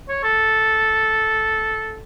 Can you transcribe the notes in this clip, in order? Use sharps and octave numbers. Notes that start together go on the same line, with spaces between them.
C#5
A4